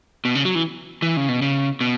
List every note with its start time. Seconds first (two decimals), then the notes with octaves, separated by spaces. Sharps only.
0.25 B2
0.35 C#3
0.45 F#3
0.55 E3
1.02 E3
1.17 C#3
1.29 B2
1.42 C#3
1.81 B2